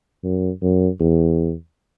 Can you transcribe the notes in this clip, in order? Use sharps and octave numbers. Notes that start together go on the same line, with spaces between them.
F#2
F#2
E2